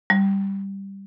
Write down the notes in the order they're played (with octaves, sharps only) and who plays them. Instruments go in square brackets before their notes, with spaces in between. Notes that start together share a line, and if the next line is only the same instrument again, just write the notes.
[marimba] G3